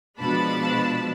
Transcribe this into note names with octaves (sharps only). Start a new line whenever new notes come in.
B2 F3 G#3 D4 A5 B5